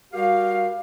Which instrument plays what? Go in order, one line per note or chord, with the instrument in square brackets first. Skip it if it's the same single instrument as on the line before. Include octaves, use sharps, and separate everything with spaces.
[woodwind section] G3 F#4 G4 A#4 F5